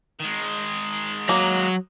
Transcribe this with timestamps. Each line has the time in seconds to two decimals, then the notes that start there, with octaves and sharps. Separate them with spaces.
0.20 D#3 G#3
1.29 F#3 A#3